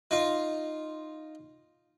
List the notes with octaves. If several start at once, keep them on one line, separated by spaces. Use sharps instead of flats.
D#4 F4